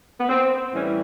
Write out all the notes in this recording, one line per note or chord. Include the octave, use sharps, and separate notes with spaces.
B3
C4
A2 E3 G3 C#4